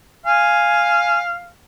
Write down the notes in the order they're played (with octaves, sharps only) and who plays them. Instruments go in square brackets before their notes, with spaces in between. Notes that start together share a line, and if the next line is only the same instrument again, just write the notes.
[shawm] F5 [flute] G#5